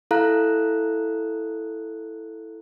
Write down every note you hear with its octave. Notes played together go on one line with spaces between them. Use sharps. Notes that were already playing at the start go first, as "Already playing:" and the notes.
E4 A4 F5 A#5 F#6